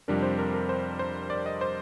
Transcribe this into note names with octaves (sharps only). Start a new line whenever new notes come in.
F2 C3 G3 D4 A#4
C5
A#4
A#4
C5
C5
D5
D#5
C5